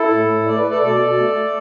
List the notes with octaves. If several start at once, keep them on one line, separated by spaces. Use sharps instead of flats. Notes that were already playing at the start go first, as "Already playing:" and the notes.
Already playing: E4 A4
A2
A2
A3 D5
B4
A3
A4 D5
B2 A4 D5
B2
A3
A3